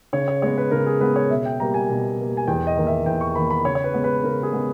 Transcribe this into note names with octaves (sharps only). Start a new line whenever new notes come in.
C#3 C#5
C#5
G#3 B3 C#5
B4
C#3 A#4
G#4
G#3 B3 B4
C#5
B2 E5
G5
G3 A#3 A#5
G#5
B2
G3 A#3
G#5
E2 G5
D#5
D#3 A#3
E5
E2 G5
C#6
D#3 A#3 B5
B5
C#3 C#5
C#5
B4
G#3 B3
B4
C#3 A#4
G#4
G#3 B3